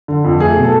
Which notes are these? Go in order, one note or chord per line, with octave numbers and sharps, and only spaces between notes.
D3
F2
A3 G#4
B2
A4